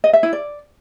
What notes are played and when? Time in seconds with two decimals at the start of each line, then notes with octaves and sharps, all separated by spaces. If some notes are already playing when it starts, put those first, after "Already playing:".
0.04 D#5
0.13 E5
0.23 E4
0.33 D5